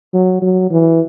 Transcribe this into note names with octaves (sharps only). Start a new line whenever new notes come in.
F#3
F#3
E3